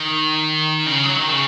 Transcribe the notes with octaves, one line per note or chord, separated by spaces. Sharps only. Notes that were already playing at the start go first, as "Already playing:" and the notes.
Already playing: D#3
C#3
F#3
D#3
C#3